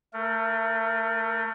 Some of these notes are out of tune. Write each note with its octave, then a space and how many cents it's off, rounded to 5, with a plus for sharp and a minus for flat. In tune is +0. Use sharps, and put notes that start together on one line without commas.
A3 +30 A#4 -5